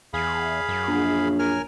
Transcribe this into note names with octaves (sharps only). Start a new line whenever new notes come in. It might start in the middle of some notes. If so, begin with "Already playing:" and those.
E2 G#4 F5 B5
F#2
A#1
A#4 G#5 F6